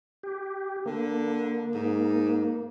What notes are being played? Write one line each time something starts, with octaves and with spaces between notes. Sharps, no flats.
G4
D3 A#3
G#2